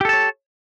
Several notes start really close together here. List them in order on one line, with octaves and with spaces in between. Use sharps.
G4 A4 A5 C#5